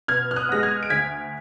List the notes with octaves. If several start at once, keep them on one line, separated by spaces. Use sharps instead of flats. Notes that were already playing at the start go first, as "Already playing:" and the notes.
B2 F6 G#6
F6
D#6 F#6
G#3 B3 A#6
F6 G#6
D7
D2 G#6 B6